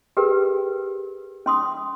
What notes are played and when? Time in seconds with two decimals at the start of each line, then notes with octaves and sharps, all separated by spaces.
0.17 G4 G#4 A#4 B4 G5
1.46 C#4 C6 D#6